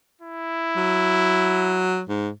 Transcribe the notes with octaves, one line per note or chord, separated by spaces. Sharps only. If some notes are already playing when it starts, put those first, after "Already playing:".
E4
F#3
G#2